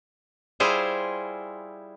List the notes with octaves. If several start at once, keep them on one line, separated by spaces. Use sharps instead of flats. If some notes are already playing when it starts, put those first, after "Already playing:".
G3 E4 F4 G#4 C5